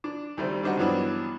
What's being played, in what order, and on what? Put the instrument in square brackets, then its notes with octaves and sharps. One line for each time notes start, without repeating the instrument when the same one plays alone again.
[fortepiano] D4
D2 D#3 G3 A3 C4
G3 C4 D4 D#4 F#4
G2 E3 F#3 B3 D4